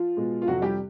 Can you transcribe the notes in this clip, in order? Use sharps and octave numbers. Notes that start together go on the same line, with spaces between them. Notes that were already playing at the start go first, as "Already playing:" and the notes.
Already playing: F3 F4
B2 G#3
F4
F2 C3 F3 F#3 F#4
G3 G4